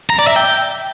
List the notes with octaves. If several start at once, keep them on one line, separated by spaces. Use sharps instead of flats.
A#5
D5
E5
G5